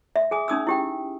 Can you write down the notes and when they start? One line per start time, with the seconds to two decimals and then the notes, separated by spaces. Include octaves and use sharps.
0.16 E5
0.31 G#4 G#5 D#6
0.48 C#4 D#4 D#6 E6
0.67 E4 G4 G5